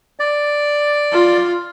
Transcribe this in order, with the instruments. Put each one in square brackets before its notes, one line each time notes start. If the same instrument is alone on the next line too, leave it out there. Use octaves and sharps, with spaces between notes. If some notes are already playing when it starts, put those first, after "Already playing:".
[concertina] D5
[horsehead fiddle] F4